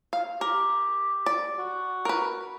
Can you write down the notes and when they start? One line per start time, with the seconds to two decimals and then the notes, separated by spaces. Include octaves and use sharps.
0.13 F5
0.41 G4 A#4
1.26 D5
1.58 F#4
2.05 A#4 B4